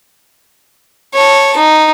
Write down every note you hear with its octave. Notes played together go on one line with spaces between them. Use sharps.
C#5 A5
D#4